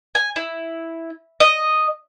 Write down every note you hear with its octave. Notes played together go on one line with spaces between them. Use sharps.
G#5
E4
D#5